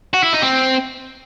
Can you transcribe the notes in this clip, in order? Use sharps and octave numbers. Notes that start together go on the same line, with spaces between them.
F#4
E4
D#4
C4